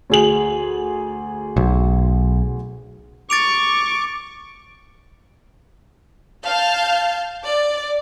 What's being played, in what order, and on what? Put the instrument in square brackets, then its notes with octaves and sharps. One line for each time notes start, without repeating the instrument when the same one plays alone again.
[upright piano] D2 G#4 F#7
[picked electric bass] B1
[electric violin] C#6 [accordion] D6 [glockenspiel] A6 D7 F7
[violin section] F5 A5 F6 G6
D5